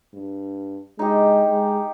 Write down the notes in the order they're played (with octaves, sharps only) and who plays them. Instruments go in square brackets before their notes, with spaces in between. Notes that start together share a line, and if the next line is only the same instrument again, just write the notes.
[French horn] G2
[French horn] G#3 [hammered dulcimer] D#4 G4
[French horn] G#3